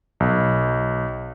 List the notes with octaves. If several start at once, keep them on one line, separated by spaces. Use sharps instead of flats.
B1